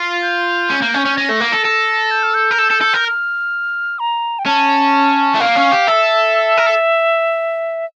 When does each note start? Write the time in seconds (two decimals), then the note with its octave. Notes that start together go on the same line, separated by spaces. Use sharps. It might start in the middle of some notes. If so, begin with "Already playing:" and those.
Already playing: F4
0.23 G6
0.70 C#4
0.82 A#3
0.94 C#4
1.05 C#4
1.17 C#4 A#6
1.29 A3
1.40 A#3
1.52 A4
1.65 A4
2.11 G6
2.23 F6
2.34 G6
2.51 A#4
2.59 A4
2.71 A4
2.81 A4
2.94 A#4
3.05 F6
3.99 A#5
4.39 G5
4.46 C#4 A5
5.35 A3
5.40 A#3 F5
5.56 C#4
5.72 G4
5.87 A4 E5
6.57 A#4
6.66 A4